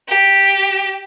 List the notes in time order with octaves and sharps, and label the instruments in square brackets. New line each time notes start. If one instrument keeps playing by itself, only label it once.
[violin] G4